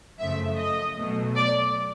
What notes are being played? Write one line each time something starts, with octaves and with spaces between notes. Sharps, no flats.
F#2 C#3 F3 A3 E5
D#5
B2 F#3 A3
D5